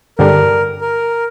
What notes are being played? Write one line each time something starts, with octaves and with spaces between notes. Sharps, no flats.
G2 D3 G3 D4 A#4
A#4